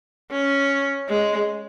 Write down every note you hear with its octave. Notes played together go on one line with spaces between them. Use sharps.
C#4
G#3